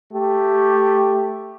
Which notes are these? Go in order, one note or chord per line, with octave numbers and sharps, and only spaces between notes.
A3 G4